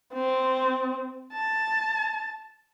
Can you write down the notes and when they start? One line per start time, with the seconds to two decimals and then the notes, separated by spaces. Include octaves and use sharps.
0.13 C4
1.33 A5